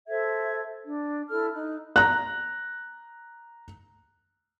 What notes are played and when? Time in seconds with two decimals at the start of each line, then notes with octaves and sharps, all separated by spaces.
0.08 A4 C5 E5 G#6
0.84 D4
1.29 E4 A4 F6
1.53 D#4 F#6
1.96 A#5 F#6